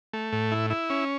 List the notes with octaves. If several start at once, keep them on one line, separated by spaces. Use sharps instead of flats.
A3
A2
E4
E4
C#4